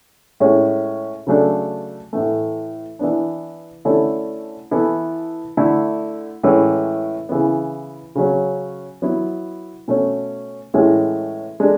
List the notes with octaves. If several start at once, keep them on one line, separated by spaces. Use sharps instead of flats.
A2 G#3 C#4
C#3 F#3 A3 D4 A4
A2 E3 A3
E3 B3 D4
D3 A3 C#4 E4 A4
E3 B3 E4 A4
D3 A3 E4
A2 E3 G#3 C#4 E4
C#3 E3 B3
C#3 F#3 C#4
F#3 B3 E4
B2 A3 C#4
A2 E3 G#3 C#4
G#3 D4 A4